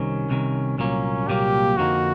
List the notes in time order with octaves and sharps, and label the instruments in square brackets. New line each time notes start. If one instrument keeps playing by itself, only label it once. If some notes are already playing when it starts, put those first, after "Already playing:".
Already playing: [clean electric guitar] C2 C3 D#3 [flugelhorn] C#4
[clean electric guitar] C2 C3 D#3
[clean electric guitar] C2 A#2 F#3 A#3 [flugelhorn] C#4
[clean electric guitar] C2 A#2 F#3 A#3 [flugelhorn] G4
[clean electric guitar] F2 D3 F3 A#3 D#4 [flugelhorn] F#4